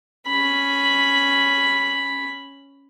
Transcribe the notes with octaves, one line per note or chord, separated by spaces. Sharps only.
C#4 B5